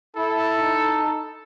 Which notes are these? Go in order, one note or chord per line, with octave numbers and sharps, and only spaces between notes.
E4 A4
D#4